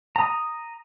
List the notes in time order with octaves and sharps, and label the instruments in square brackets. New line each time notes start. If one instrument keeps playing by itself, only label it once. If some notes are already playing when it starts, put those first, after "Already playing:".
[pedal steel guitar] A#5 D#6